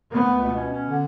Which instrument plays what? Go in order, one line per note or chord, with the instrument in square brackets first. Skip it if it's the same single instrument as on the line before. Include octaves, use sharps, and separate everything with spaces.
[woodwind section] A3 [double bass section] B3
[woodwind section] C#2
B2
C#4
C#4
D3